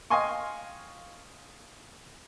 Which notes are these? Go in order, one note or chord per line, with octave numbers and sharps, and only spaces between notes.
D#5 F5 G5 G#5 C6 C#6